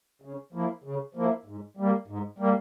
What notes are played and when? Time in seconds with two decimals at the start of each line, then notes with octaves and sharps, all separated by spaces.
0.22 C#3
0.53 F3 A#3 E4
0.84 C#3
1.15 F3 A#3 E4
1.46 G#2
1.77 G3 A#3
2.08 G#2
2.38 G3 A#3